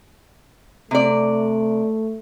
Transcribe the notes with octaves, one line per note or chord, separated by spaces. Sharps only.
C3 A3 D5